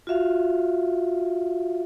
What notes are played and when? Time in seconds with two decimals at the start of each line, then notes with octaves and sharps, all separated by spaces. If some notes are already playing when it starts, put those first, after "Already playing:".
0.07 F4 F#4 E5 F5